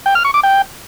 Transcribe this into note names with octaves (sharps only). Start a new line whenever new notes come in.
G5
F6
C#6
D6
G5